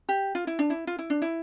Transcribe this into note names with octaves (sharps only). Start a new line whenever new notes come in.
G4
F4
E4
D4
E4
F4
E4
D4
E4